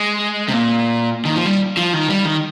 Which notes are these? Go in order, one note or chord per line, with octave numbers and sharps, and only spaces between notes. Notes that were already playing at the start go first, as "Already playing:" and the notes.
Already playing: G#3
C3
A#2
D#3
F3
G3
F3
D#3
G3
D#3